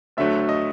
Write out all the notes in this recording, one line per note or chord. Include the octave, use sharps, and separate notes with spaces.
D2 D3 F#3 A3 E5
D#5